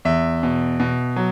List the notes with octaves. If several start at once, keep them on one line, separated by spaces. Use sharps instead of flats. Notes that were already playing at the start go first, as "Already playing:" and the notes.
E2 E5
B2
B2
F#3